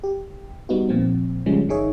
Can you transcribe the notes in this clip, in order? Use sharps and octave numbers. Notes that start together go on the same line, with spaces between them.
G4
G3 B3 D#4 F#4
A#2 F3 C4
C#3 F3 G3 G#3 C#4
G1 D#3 D#4 G#4 C#5 E5